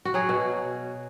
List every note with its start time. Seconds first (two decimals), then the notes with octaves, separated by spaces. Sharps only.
0.05 F#4
0.14 F#3 G#4
0.29 B2